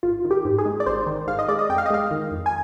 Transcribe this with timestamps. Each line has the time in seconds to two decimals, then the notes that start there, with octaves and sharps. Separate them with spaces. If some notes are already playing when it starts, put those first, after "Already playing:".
0.03 G#1 F4
0.25 D#3
0.31 G4
0.45 G#2
0.58 G#4
0.66 G#3
0.80 D5
0.86 G#1 C5
1.07 D#3
1.28 G#2 F5
1.39 D#5
1.48 G#3 D5
1.59 D#5
1.69 F2 G5
1.78 F5
1.86 D#5
1.91 G#3 F5
2.11 D#3
2.31 F2
2.46 G#5